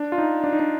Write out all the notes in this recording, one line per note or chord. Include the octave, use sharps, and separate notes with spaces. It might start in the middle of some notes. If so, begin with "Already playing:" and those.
Already playing: D4
F4
D#4
D4
D#4
D4